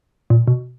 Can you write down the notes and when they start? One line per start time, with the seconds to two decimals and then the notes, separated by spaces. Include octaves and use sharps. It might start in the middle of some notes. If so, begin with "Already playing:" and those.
0.30 A#2
0.48 B2